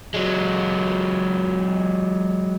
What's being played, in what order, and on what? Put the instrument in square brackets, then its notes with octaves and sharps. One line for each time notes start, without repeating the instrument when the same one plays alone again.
[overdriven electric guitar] F#3 G#3